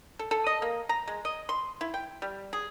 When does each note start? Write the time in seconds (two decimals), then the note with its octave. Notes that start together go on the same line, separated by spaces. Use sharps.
0.19 A4
0.31 A4
0.47 D#5
0.62 A#3
0.89 A#5
1.08 G#3
1.25 D#5
1.49 C6
1.81 E4
1.94 G5
2.22 G3
2.53 G#4